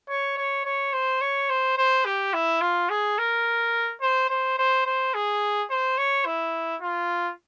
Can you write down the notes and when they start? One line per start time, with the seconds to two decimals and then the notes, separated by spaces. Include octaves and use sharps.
0.09 C#5
0.37 C#5
0.65 C#5
0.93 C5
1.21 C#5
1.49 C5
1.78 C5
2.05 G4
2.34 E4
2.61 F4
2.90 G#4
3.18 A#4
4.01 C5
4.30 C5
4.58 C5
4.86 C5
5.14 G#4
5.70 C5
5.98 C#5
6.25 E4
6.82 F4